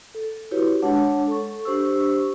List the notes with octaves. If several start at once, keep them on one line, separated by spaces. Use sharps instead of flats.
A4
E4 F#4 G4 B4 C#5
G#3 D4 C#5 F#5 A5
A4 C#6
D4 G4 C5 C#6 E6